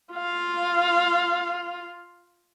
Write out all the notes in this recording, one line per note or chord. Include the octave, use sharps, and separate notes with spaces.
F4 F5